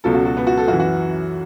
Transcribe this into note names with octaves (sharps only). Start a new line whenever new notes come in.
C#2 B2 F#3 A4
F#4
F#4
B3
F#4
A4
F#2 E3 F#4
F#4